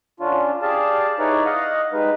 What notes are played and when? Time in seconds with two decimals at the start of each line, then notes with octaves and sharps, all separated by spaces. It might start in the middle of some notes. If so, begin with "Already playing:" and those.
0.20 D3 C#4 D4 F4
0.62 G4 G#4 D5 F5 A5
1.19 D#4 E4 G#4 B4 C#5 D5
1.46 D#5 F5 F#5
1.93 G3 G#3 D#4 B4